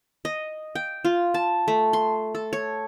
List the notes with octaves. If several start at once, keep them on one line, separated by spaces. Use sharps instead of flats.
D#5
G5
F4
A5
A3
C6
A4
C#5